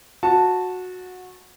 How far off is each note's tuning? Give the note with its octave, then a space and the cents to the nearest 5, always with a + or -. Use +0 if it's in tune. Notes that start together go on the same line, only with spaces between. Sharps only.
F#4 -15 A5 +0